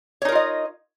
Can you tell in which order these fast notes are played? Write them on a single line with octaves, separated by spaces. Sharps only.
C#5 D#4 A#4 F4 D#5